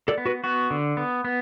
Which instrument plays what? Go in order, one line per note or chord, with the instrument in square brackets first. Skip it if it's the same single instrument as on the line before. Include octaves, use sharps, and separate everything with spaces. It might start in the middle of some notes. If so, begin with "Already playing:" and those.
[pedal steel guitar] A4 D5
B3
F#4 B4
B3 F#4
D3
B3
B3